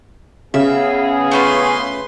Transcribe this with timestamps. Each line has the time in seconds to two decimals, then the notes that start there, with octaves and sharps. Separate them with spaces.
0.54 C#3 B3 G#4 E5
1.31 A3 C#4 F4 B4 C6